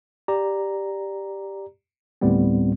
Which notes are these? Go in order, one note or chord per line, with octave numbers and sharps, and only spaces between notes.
G4 D5 A#5
D2 A2 G3 B3 C4